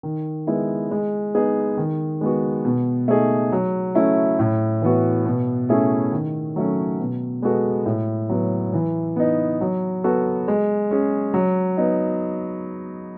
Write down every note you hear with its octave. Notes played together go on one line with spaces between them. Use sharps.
D#3
G#3 B3 E4
G#3
B3 D#4 G#4
D#3
G#3 B3 F#4
B2
A3 D#4 G#4
F#3
A3 C#4 E4
A2
E3 B3 F#4
B2
A3 C#4 E4 G#4
D#3
F#3 A3 C#4
B2
G#3 B3 F#4 A4
A2
F#3 B3
E3
B3 D#4
F#3
B3 F#4 A4
G#3
C#4 G#4
F#3
B3 D#4